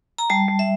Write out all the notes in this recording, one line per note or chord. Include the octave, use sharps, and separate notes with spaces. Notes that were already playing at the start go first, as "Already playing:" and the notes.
A#5
G3 A5
G3
E5